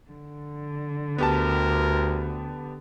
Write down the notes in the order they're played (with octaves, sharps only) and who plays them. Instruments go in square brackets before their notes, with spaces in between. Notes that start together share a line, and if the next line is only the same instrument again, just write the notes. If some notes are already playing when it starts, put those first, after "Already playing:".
[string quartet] D3
[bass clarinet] D2 [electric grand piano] B3 G4 A5 [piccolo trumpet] A#4